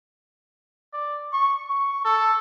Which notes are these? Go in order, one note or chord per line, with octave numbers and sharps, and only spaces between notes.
D5
C#6
C#6
A4